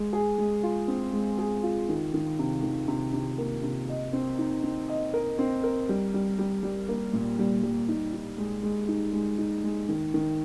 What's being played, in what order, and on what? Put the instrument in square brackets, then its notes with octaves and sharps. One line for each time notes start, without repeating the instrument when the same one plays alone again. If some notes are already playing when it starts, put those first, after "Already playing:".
Already playing: [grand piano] G#3
G#4
G#3
F4
C4
G#3
G#4
F4
D#3
D#3
C3
D#3
C3
C3
A#3
C3
D#5
C4
D#4
C4
D#5
A#4
C4
A#4
G3
G3
G3
G3
A#3
A#2
G3
G3
D#4
D#4
G#3
G#3
D#4
G#3
D#4
G#3
D#3
D#3